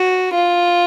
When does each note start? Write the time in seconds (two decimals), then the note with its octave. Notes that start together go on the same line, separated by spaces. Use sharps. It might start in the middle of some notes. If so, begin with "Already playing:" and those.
Already playing: F#4
0.34 F4